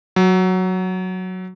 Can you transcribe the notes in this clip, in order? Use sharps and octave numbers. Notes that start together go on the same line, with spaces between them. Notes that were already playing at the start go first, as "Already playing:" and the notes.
F#3